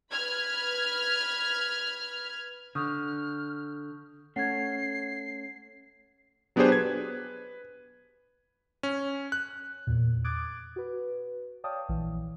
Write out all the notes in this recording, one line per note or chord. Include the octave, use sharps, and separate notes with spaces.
B4 B5 F6 G#6
D3 C#6 D#6 F6 G6
A3 C#4 F#5 G#6 C7
F#3 B3 D4 G4 G#4 C5
B4 G#6
C#4
F#6
E2 A#2
D6 D#6 F#6 G#6 A6 D7
F#4 B4
C#5 D5 F5 G5 A5 D#6
A#1 E3